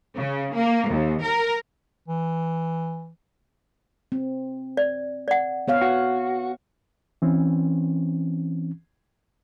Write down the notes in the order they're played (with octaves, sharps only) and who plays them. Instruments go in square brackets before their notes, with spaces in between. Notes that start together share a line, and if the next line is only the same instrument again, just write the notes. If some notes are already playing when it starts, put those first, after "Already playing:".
[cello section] C#3
A#3
D#2
A#4
[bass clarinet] E3
[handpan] C4
[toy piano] D5
D5 F#5
[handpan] B3 C#5 F5
[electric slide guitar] F#4
[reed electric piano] E3 C4 C#4